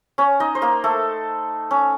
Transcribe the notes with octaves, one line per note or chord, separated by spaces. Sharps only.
C#4 C#5
D#4 D#5
C5
A#3 A#4
A3 A4
C#4